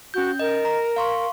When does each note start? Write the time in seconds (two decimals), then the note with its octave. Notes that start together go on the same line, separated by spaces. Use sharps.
0.14 C#4 F#4 G6
0.39 A#4 D#5
0.65 A#5
0.96 F5 C6 C#6